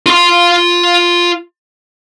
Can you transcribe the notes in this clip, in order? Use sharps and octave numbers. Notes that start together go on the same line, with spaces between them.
F4 C6